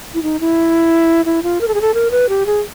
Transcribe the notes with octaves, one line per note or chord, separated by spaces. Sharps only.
E4
D#4
E4
E4
F4
A#4
A4
G#4
A4
A#4
B4
G4
G#4